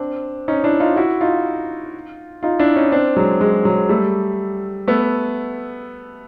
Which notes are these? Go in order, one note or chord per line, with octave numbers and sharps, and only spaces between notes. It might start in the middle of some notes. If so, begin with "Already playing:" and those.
Already playing: C4 D4
C#4 D#4
D4 E4
D#4 F4
E4 F#4
D#4 F4
D#4 F4
D4 E4
C#4 D#4
C4 D4
F#3 G#3
F#3 G#3
F#3 G#3
G3 A3
A3 B3